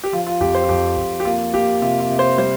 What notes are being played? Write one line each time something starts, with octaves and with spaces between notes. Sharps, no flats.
G4
F3 F4
F4
F2 G4
C5
F4
F2 G4
F2
G4
A#3 F4
A#3 G4
C3 F4
F4
C3
C5
G3 C5